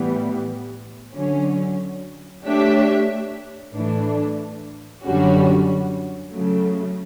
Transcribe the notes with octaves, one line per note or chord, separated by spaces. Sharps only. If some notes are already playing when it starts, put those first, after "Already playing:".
Already playing: A2 E3 G3 B3
D3 F#3 C#4
A3 D4 G4 C#5 E5
A2 E3 A3 D4
F#2 D3 G3 C#4 F#4
C#3 F#3 A3